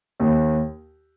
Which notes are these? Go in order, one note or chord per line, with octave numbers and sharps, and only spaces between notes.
D#2